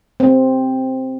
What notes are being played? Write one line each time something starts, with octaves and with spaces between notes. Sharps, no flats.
C4